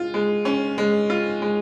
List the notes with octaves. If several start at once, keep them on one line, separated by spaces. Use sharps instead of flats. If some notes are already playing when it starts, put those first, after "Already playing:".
Already playing: G#3 F4
G#3
C#4
G#3
F4
G#3